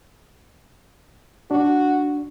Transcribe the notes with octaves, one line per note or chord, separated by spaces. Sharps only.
D4 F#4